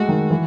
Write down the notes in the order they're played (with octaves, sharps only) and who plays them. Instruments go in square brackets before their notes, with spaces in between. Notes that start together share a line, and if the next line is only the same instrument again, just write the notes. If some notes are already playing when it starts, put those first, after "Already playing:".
Already playing: [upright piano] G#3 A3 [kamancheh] F#4
[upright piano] D#3
E3